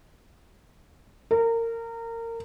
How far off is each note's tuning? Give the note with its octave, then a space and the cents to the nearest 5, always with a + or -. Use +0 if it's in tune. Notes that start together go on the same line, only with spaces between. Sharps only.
A#4 -25